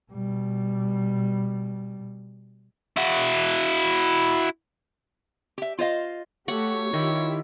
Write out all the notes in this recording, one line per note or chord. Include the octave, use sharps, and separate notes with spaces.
B2 G3
E4 F#4
G4 E5
F4 C5 D#5 F5
A3 F#4 G4 C#5 F#5
D#3 E4 F4 G4